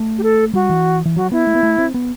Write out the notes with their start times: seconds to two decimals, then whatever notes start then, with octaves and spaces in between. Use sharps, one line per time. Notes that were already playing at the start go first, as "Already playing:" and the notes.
Already playing: A3
0.18 G4
0.23 A4
0.54 G3 F#4
0.70 E3
1.06 E3
1.16 F#3 F#4
1.32 B3 E4
1.47 A3
1.55 B3
1.63 A3
1.78 C4
1.94 B3